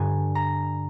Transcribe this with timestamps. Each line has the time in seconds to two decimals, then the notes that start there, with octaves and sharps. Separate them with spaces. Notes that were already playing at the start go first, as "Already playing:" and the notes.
Already playing: G2 D3 G#5 A#5
0.35 A#5